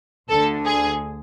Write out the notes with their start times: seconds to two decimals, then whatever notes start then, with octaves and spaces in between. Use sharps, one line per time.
0.29 D2 D3 A4
0.65 G#4